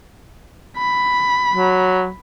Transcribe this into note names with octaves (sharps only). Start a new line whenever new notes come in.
B5
F#3